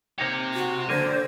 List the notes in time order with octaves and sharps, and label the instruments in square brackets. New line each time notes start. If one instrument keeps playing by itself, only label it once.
[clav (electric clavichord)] A#3 D#4 C#5 [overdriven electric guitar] C4 G4
[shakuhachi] F#4
[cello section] D3 [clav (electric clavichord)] A#3 G#5 [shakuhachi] C5